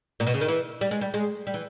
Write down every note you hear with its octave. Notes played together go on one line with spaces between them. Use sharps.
A#2
B2
C#3
D#3
E3
G3
G#3
G3
G#3
G3
E3